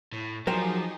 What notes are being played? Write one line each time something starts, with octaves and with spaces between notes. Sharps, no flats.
A2
F3 F#3 D#4 G4 G#4 A#4 C5 G5